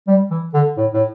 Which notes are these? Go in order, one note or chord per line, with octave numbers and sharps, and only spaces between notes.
G3
E3
D3
A2
A2